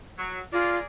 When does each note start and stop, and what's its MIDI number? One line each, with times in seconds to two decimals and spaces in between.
0.18 0.39 54
0.52 0.77 65
0.52 0.83 68
0.52 0.83 70
0.52 0.83 74